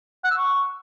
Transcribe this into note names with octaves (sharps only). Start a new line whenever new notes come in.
F#5
E6
C#6